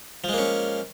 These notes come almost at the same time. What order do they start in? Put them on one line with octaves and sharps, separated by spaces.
F3 G#3 A#3 C#4